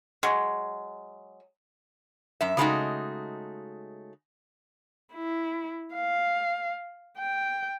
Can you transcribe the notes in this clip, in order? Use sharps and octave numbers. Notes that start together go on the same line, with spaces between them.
F#3 G#3
F#2 E5
C#3 F#3 G#3 A3 D#4 F#4
E4
F5
G5